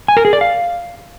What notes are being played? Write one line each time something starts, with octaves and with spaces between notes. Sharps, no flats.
G#5
A#4
G#4
D5
F5